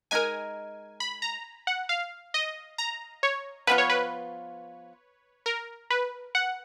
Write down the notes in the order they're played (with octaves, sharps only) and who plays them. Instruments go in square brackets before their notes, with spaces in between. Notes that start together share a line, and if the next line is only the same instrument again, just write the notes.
[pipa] G#3 D#4 A#4 [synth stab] G#5
[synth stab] B5
A#5
F#5
F5
D#5
A#5
C#5
[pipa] F3 B3 F4 [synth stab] B4
[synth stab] C#5
B4
A#4
B4
F#5